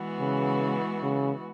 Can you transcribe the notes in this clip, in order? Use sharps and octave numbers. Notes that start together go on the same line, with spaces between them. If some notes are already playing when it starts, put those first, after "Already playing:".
Already playing: E3 G#3 B3 F#4
C#3
C#3